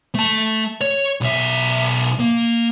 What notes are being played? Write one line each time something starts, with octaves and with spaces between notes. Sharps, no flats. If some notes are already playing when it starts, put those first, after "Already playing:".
A3 A5
C#5
B1 E5
A#3